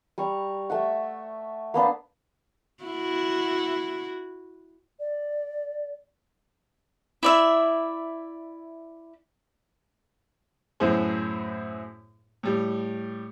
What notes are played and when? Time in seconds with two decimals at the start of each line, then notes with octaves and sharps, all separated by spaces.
0.18 G3 A#5 C#6
0.70 A3 E5 F#5
1.74 A#3 B3 D4 C5
2.83 E4 F#4
4.99 D5
7.23 E4 D5 E5
10.80 F#2 A2 B3 E4 G#4 C5
12.43 A2 G3